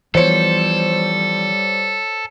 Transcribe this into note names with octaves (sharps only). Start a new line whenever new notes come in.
E3 F3 G3 B3 A4 C5 C#5 C#7